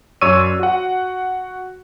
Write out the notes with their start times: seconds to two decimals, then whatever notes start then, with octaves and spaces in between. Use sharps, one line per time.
0.21 F#2 C#5 D5 C#6 E6 D#7
0.60 F#4 F#5